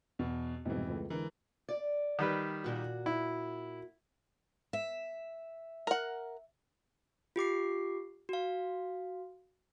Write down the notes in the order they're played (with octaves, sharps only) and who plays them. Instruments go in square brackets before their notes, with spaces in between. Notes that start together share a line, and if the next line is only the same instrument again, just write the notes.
[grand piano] E2 B2
[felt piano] C2 G#2 B2 [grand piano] F2 E3
[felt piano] C#2 A3 B4
[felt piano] D3 G#3 [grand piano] E3 A#4
[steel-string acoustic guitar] D5
[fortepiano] D#3 G3 B4
[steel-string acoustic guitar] A#2 F#4
[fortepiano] E4
[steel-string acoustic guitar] E5
[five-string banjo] A#4 F#5
[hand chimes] F4 G4 D6 C7
F#4 F5